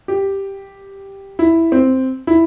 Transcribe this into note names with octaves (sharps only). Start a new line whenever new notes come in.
G4
E4
C4
E4